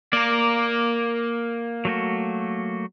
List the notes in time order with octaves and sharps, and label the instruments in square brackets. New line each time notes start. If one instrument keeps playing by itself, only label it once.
[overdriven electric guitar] A#3 [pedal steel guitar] A#4 D5
[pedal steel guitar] F#3 A3 F#4